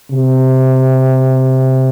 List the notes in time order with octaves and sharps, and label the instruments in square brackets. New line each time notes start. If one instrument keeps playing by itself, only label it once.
[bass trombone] C3